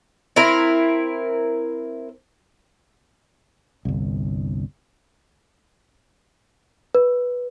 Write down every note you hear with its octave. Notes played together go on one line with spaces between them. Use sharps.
C4 E4 A#4
G1 C2
B4